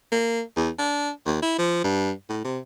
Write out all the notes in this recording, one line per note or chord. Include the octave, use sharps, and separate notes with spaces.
A#3
E2
D4
D#2
E4
F3
G2
A2
C3